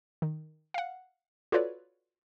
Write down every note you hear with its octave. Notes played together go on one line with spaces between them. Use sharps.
D#3
F5 F#5
F4 F#4 A4 B4 C#5 D5